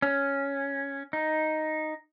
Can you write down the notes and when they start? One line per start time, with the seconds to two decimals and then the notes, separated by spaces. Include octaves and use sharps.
0.02 C#4
1.13 D#4